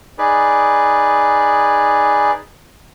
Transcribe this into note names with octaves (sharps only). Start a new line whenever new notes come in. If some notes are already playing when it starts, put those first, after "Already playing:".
D#4 G#4 B4 D5